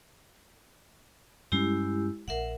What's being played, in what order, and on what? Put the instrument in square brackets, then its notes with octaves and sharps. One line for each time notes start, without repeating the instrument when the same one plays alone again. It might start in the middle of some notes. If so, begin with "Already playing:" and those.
[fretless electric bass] G2 G3 C#4 [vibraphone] G#3 E4 G4
[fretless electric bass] D#1 A#1 [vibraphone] A#4 E5 F#5